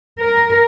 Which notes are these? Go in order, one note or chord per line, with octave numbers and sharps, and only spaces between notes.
A#4